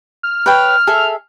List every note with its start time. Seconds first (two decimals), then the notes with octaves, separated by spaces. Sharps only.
0.23 F6
0.46 B4 C#5 G5
0.87 G#4 A4 E5